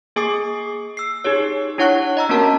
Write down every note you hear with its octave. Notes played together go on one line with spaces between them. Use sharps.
A#3 G#4 G#5 D6 D#6 C7
E6 C7
D#4 G4 G#4 C#5
D4 E4 C#5 F#5 C#6 F#6
D#5 A#5 E6
A#3 B3 C#4 F#4 A#4 A5